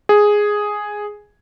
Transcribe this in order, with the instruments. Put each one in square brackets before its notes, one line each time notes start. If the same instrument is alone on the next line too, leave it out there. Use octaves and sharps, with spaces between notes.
[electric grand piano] G#4